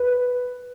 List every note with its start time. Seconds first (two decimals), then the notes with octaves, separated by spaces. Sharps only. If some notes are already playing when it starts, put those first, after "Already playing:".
Already playing: B4